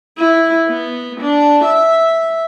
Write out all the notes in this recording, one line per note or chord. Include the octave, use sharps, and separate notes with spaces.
E4
B3
D4
E5